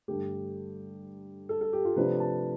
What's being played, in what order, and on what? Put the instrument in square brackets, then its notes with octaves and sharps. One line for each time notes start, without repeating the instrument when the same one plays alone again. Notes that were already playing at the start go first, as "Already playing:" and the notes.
[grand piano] G2 D3 A3 G4
A4
A4
G4
F4
C3 F3 A3 D4 B4
A5